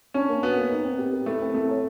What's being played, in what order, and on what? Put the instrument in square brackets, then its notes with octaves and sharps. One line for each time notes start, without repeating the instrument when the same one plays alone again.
[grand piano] C#4 [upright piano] D4
[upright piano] A#3
[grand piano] B3 [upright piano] F#4
[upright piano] A#3
D#4
C4
G4
A#4
[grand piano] A3 [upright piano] E4
[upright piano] C4
[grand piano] A3 [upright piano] A4
[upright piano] C#5